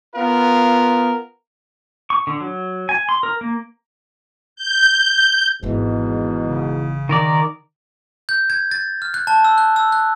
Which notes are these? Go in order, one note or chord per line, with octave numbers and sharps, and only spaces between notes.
B3 F4 A#4
C#6
D3
F#3
G#5
C6
A#4
A#3
G6
G#1 E2 G#2 B2 E3
C#3
D#3 A#4 D5
G6
G#6
A6
F6
F#6
A5
E6
F#6
E6
F#6